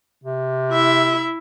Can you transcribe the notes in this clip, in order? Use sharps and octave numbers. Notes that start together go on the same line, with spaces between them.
C3
E4 E5